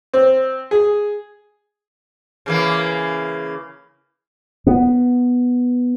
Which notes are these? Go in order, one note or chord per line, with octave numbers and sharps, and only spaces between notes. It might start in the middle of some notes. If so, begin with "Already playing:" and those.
C4
G#4
C#3 E3 A#3
B3